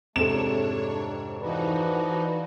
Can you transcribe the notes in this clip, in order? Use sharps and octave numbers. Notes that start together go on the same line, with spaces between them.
F2 G#2 C3 A3 D4 A4 C#5 E7
E3 F3 D#4 F#4 B4 D5